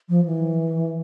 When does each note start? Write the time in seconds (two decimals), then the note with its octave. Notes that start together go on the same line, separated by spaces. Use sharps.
0.09 F3
0.25 E3